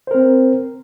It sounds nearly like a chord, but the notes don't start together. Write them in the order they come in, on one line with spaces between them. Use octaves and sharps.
C5 A#4 C4